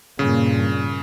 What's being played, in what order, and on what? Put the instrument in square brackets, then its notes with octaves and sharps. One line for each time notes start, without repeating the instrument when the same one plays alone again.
[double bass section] G2 A#2 [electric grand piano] C#3